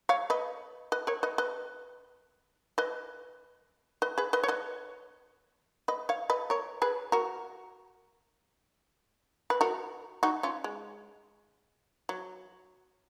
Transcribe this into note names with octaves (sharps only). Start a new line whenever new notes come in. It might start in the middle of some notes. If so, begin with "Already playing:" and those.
C#5 F5
B4 D#5
B4 D#5
A#4 C#5
B4 D#5
B4 D#5
B4 D#5
B4 D#5
G#4 B4
B4 D#5
C#5
B4 D#5
B4 D#5
C#5 F5
B4 D#5
A#4 C#5
G#4 B4
F#4 A#4
B4
F#4 A#4
D#4 F#4
C#4 F4
G#3
F#3